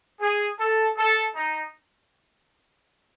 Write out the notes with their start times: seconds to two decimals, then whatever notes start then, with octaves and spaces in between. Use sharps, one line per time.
0.21 G#4
0.59 A4
0.97 A4
1.35 D#4